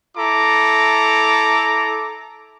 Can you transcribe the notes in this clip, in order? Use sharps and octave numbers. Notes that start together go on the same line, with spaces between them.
E4 A4 A#5 D6